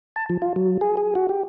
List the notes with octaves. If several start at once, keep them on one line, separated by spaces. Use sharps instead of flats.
A5
F3
F4
F#3
G#4
G#4
F#4
G4